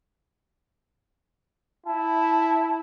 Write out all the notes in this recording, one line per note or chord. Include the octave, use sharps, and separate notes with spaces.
E4 A5